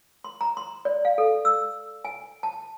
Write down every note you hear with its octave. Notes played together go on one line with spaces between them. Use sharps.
C6
A#5
C6
D5
F5
A4
E6
G#5
A5